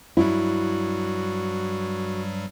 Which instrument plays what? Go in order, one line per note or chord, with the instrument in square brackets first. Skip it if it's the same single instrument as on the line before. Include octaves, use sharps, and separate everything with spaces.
[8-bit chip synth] G2 F#3 G3 [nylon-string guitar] E4 [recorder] F#4